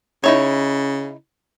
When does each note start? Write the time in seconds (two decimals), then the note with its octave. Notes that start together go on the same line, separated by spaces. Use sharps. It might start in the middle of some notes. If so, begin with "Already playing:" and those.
0.24 C#3 D#4 E4 C#5